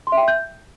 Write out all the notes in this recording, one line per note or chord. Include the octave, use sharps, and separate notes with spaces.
C6
E5
G5
E5
G6